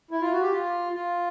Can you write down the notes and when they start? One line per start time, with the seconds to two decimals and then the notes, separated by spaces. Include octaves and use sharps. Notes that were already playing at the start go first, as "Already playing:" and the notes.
0.11 E4
0.22 F4
0.32 F#4
0.42 G4
0.52 F4
0.93 F4